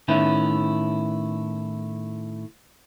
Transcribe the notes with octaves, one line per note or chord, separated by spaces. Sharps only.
A2 D#3 B3 C#4 E4